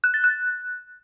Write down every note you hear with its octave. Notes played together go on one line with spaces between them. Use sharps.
F#6
A6
F#6